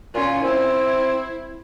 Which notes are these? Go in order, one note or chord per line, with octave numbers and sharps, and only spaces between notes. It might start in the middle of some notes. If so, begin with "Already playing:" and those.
A#2 C#4 F4
C4 E4